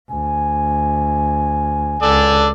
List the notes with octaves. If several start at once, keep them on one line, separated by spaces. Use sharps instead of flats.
D2 G#5
C#2 A4 D5